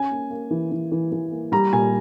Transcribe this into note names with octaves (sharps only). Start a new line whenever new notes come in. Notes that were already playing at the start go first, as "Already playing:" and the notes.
Already playing: C#4 G#5
A#3
A#3
E3
E3
E3
E3
A#3
G3 A#5
A#2 G#5